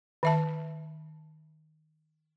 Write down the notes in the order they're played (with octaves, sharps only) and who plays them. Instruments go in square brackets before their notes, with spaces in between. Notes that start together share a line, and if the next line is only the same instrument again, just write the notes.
[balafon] D#3 E5 A5